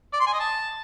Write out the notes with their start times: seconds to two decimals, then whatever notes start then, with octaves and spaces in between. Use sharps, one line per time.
0.13 D5
0.20 C6
0.27 G#5
0.33 D#5
0.40 A5